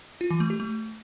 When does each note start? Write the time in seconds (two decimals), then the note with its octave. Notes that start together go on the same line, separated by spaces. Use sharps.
0.21 F4
0.31 E3
0.40 A3
0.50 G4
0.60 A3